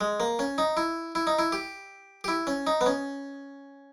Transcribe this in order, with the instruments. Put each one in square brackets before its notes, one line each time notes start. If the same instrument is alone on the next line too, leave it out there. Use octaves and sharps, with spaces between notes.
[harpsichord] G#3
A#3
C#4
D#4
E4
E4
D#4
E4
G4
G4
E4
C#4
D#4
B3
C#4